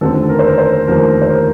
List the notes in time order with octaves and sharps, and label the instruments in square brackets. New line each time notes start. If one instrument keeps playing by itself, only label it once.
[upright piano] F1 D#2 D3 F3 C4 [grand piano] A4
[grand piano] A#4
C5
A#4
C5
[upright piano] F1 D#2 D3 F3 C4 [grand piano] A#4
[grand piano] C5
A#4